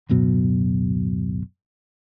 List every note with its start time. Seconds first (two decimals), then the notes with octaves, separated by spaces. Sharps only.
0.09 D1 F#2 B2 F#3